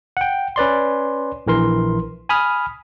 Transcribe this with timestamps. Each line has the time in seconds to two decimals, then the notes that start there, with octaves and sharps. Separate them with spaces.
0.17 F#5 G5
0.56 C#4 B4 D5 C6
1.47 A#1 E3 A#4 C6
2.29 G#5 B5 D#6 F6